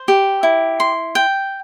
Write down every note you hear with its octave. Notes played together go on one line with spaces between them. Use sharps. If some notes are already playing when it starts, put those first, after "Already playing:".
Already playing: C5
G4
E4
C6
G5